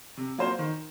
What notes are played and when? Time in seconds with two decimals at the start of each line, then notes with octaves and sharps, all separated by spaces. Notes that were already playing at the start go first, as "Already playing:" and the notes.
0.17 C3
0.38 F#3 A#3 F4 C5
0.59 D#3